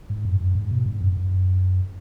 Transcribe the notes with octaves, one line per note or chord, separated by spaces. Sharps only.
G#2
F#2
F#2
G#2
B2
G#2
F#2
F#2